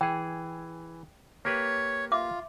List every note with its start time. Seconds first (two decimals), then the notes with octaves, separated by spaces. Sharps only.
0.01 E3 G#4 G5
1.45 A#3 G4 B4 C#5
2.12 F4 E5 D6